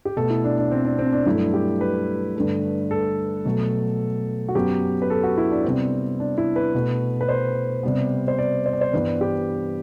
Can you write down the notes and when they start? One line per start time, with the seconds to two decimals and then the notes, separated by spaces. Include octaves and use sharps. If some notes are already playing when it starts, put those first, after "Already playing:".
0.05 G4
0.17 B2 A3 A4
0.30 E4
0.44 D4
0.58 D4
0.71 C4
0.85 D4
0.99 C4
1.12 D4
1.26 G2 F#3 A3 E4
1.54 G4
1.81 B4
2.36 G2 D3 A3
2.91 A4
3.45 B2 F#3 A3
4.49 F#4
4.55 F#2 F#3 B3 G4
5.02 B4
5.10 A4
5.24 F#4
5.38 E4
5.51 D4
5.65 C3 G3 B3 C4
6.20 D4
6.38 E4
6.56 B4
6.74 B2 A3
7.21 B4
7.29 C5
7.83 C3 G3 B3
8.28 C5
8.39 D5
8.66 C5
8.73 D5
8.81 C5
8.93 G2 E3 G3 B3 B4
9.21 G4